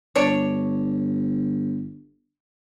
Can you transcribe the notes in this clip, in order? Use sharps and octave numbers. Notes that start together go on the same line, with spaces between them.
G1 D4 C#5